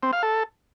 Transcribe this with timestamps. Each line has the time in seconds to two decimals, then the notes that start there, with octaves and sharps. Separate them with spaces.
0.03 C4
0.13 F5
0.23 A4